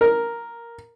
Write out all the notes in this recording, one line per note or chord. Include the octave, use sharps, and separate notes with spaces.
A#4